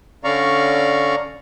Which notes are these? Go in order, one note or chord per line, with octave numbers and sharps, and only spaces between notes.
D3 C#4 D5 F5 A#5 C#6